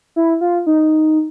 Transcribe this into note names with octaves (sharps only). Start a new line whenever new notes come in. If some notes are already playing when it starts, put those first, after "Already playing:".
E4
F4
D#4